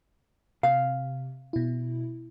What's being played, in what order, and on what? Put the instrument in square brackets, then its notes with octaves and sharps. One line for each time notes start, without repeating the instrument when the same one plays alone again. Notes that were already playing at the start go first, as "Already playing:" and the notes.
[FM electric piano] C3 [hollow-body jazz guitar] F5
[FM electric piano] B2 E4